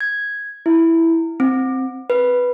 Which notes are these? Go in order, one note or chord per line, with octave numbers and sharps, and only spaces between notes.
G#6
E4
C4
B4